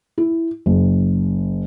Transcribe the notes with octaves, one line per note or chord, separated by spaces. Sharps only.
E4
F#1